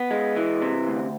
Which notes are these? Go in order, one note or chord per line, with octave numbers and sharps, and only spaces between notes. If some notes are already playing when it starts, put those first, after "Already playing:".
Already playing: B3
G#3
E3
C3
D2